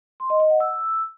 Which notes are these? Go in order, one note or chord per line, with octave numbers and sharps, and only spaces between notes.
C6
D#5
D#5
F#5
E6